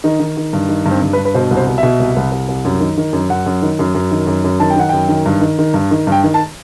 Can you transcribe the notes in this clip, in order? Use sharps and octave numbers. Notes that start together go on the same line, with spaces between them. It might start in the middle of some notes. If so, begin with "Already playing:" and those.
D#3 D#4
D#3
D#3
G2
D#3
G2
C4
G2
B4
G2
B4
B2 C5
C2
C5
B2
E5
B2
C2
C2
C2
C2
F#2
D#3
D#3
F#2
F#2 F#5
F#2
D#3
F#2
F#2
D#3
F#2
F#2
D#3 A5
G5
D#3 F#5
F#2 G5
D#3
G2
D#3
D#3
G2
D#3
G2 G5
D#3
A5